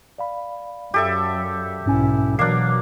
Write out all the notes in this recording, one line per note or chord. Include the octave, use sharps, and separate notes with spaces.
D5 F5 B5
F#2 G4 A4 E5
B1 G#2 C#4 E4 G#5
B2 E3 F#3 A#3 D4 C7